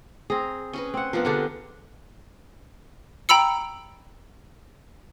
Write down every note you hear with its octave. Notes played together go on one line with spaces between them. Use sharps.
C4 G#4 A#5
C#4 G#4 B4
C4 F#5
F3 B3 D4 A#4 F#5
D3 D4 G4 G#4 F#5
G5 A#5 B5 E6 C#7